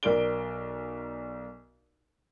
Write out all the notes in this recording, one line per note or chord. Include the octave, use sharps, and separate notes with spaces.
B1 A#4 D5 D7 G7